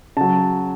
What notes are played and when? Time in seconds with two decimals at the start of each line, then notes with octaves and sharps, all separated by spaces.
0.17 C#3 F#3 A5